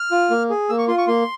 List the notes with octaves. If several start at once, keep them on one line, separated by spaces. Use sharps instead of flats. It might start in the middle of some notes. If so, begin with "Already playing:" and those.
Already playing: F6
F4
A#3
G#4
A#3 E6
C#6
F4 C6
C#6
A#3 C6